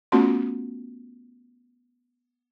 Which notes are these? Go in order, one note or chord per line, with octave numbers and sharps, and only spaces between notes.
A3 B3 C#4 F4 F#4 C6